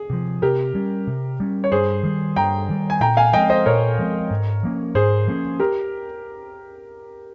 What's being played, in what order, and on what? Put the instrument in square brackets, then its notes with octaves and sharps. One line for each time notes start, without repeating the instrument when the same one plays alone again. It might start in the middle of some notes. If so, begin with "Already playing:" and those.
Already playing: [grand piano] G#4
[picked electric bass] C3 F3
[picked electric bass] C3 [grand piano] G4 A#4
[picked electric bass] G3 C#4
C3
G3 C#4
[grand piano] C#5
[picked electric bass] G2 [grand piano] G#4 C5
[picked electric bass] D#3 G3
[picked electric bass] G2 [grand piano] G5 A#5
[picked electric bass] D#3 G3
[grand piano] G#5
[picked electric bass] A#2 [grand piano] G5 A#5
[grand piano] F5 G#5
[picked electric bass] F3 G#3 C4 [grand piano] D#5 G5
[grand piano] C5 D#5
[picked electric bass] A#2 [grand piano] A#4 C#5
[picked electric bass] F3 G#3 C4
G#2
F3 A#3 C#4
[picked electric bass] G#2 [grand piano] G#4 C5
[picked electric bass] F3 A#3 C#4
[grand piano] G4 A#4